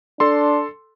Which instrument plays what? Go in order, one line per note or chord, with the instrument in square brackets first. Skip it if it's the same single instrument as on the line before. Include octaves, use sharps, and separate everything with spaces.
[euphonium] D4 [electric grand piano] A4 C6